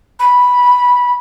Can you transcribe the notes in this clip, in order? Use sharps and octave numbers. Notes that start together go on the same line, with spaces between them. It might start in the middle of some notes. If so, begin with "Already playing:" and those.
B5